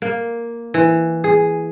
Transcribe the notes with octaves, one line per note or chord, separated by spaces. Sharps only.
A#3
E3
G#4